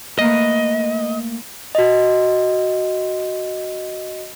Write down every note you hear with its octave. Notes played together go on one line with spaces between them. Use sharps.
A3 A#3 B4 D#5
F#4 D#5